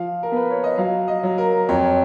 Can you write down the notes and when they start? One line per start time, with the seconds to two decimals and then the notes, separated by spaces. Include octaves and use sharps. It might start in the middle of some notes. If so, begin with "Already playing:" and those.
Already playing: F3 F5
0.23 A#4
0.32 B3 B4
0.51 C#5
0.64 D#5
0.78 F#3 F5
1.08 D#5
1.23 F#3
1.38 A#4
1.69 F2 C#5